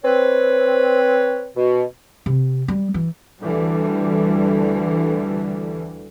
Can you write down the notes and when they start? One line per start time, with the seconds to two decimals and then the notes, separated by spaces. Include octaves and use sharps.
0.04 C4 B4 C#5
1.56 B2
2.26 C3
2.68 G3
2.94 E3
3.42 D2 D3 E3 G3